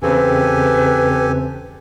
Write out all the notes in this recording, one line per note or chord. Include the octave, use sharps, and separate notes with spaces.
E2 C#3 C4 G4 A4 B4 G#5